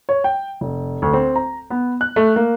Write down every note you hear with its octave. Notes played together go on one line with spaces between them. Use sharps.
C#5
G5
F1
D2
C4
A#5
B3
F#6
A3
A#3